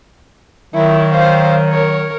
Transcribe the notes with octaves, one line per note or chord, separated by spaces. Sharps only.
D#3 F#3 E4
C5 F5
A#4 C#5